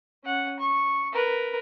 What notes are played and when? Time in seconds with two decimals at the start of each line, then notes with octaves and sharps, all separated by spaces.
0.24 C#4 F#5
0.59 C#6
1.12 A#4 B4